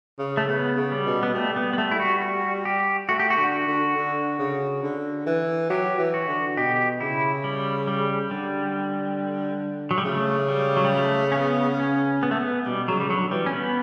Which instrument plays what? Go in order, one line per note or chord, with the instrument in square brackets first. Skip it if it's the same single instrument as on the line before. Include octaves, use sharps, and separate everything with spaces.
[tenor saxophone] C#3
[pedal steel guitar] A3
[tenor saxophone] C#3 [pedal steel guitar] B3
[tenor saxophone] C#3
[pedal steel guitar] G3
[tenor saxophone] B2
[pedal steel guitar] B3
[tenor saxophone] G3 [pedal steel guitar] A3
[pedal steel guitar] B3
B3
A3
E4
F#4
F#4
G4
[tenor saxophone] A3 [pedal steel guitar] F#4
[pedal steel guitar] G4
F#4
[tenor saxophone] D3
[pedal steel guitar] F#4
[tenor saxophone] D3
D3
C#3
D3
E3
[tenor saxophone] F#3 [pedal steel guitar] G4
[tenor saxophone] E3
[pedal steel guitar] F#4
[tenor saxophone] D3
[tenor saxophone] B2 [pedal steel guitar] G4
[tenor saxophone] C#3 [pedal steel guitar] E4
[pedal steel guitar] G3
G3
[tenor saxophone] D3 [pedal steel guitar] G3
[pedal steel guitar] F#3
G3
[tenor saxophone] C#3 [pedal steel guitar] A3
[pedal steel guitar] G3
F#3
G3
A3
C#4
B3
C#4
B3
A3
B3
[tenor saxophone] B2 [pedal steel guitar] G3
[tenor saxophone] C#3 [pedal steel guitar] F#3
[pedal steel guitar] G3
[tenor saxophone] D3 [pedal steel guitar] F#3
[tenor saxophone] E3 [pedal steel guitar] G3
[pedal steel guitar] C#4
B3